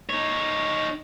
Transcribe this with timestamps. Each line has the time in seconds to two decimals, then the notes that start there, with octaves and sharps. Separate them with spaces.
0.10 D#4 C#5